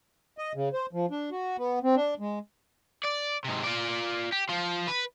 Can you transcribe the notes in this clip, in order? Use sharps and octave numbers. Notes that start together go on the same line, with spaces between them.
D#5
C#3
C5
F3
D4
F#4
B3
C4
D4
G#3
D5
G#2 C3
F4 D5
G4
F3 F4
B4